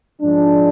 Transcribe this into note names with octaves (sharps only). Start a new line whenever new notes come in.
G#2 F3 G#3 D4